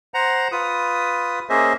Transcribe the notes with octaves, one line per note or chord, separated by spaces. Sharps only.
C5 F#5 A#5
F4 B4 D#6
A#3 C#4 G#4 C5 D#5 E5